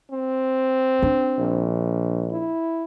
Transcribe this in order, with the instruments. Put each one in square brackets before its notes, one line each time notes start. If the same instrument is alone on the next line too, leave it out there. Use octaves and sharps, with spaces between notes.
[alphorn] C4
[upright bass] D4
[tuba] A#1
[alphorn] E4